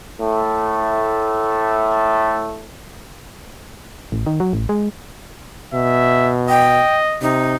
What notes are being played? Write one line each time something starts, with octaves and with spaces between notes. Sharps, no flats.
A2 A3
A1
D#3
F#3
A1
G#3
B2 E5
D#5 G5
C3 D#4